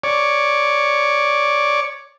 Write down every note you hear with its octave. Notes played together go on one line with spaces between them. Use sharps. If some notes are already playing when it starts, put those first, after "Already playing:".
C#5 D5